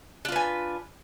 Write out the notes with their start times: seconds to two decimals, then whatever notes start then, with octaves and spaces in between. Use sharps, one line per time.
0.25 D4
0.28 F4
0.32 B4
0.36 G#5